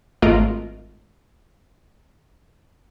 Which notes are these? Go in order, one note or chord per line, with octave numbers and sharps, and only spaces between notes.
G#1 A3 F4 A#4 D#5 D7